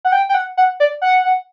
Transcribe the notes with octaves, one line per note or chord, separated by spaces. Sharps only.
F#5
G5
G5
F#5
F#5
D5
F#5